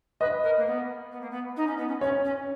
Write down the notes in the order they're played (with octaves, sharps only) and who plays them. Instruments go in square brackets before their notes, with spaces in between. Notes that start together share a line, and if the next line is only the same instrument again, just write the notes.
[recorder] B4 [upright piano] D#5
[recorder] A#4
A#3
B3
B3
A#3
B3
D#4
C#4
B3
C#4
[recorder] C#4 [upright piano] C#5
[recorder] C#4